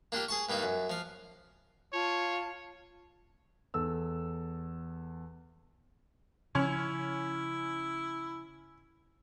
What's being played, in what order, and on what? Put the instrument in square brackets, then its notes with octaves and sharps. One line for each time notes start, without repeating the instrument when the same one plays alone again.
[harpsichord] A#3 D4 F4 G4
G#4 A5 C#6
G2 G3 A#3 D#4
F#2
F3 F5
[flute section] F4 A5 [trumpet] C#5
[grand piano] E2 A4 E6
[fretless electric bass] C#3 F3 [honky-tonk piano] C#4 [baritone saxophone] E4